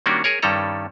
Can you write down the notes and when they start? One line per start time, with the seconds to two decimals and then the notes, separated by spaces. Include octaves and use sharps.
0.06 D#3 G3 A#3 C#4 D4 F#4
0.24 G#4 A#4 C#5
0.42 G2 D#3 G3 C#4 A4 A#5